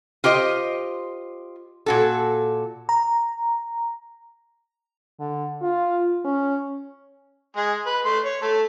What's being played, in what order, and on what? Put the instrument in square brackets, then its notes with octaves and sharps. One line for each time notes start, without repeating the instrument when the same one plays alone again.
[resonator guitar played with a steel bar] F4 G4 C5 D#5
A#2 F#4 A4
[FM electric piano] A#5
[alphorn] D3
F4
C#4
[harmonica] G#3 G#4
B4
A3 C6
C#5
A3 A4